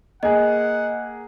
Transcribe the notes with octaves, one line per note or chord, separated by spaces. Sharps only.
A#3 G#4 D#5 F#5